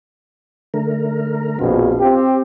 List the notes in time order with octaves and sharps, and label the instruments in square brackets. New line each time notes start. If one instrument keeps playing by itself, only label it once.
[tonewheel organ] D3 A3 A#4
[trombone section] A#1 F2 B2 [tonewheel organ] F4
[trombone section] C4 G4